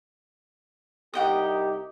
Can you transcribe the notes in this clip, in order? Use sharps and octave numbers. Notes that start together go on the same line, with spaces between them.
C2 D#4 G4 F#5 G5 D#6